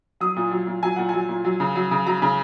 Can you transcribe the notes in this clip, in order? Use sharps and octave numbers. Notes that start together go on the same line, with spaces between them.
F#3 D#6
A#2
F#3
A#2
F#3 G#5
A#2 F#5
G#5
F#3
A#2
F#3
C#3
F#3
C#3
F#3 A#5
C#3